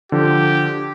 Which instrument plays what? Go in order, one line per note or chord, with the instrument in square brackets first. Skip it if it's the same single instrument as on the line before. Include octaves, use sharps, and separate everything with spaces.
[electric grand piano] D3 F3 [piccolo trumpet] G4